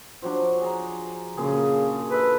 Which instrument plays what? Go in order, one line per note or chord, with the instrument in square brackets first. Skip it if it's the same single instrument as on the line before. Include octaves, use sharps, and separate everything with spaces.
[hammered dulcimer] F3 F#3 D4
G#4 A#5
[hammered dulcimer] F#2 A#2 G#4 [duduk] C#3
[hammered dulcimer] A4 E5 [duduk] B4